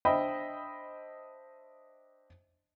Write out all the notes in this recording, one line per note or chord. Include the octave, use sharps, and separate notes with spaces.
D4 C5 D#5 E5 G5 B5